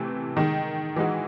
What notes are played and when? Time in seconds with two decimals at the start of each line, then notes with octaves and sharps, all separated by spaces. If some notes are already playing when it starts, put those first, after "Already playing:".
Already playing: C3 E3 A3
0.36 D#3 G#3 D#4
0.96 E3 G#3 D#4 F#4